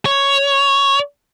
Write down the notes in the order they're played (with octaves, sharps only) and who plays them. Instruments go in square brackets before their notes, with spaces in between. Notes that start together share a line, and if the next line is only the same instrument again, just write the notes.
[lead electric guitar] C#5